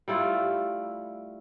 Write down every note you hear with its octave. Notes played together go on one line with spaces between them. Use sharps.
G3 A3 E4 F4